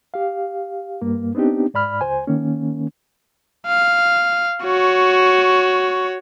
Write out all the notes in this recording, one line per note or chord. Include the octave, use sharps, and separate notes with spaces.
G4 F5
G2 A#3
B3 C4 D4 D#4 G4
G#2 D5 B5 F6
C#2 C5 G#5
D#3 A#3 C#4
F5
F#4 C#5